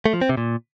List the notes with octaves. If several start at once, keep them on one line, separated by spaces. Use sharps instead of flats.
A3
F3
C4
C3
A#2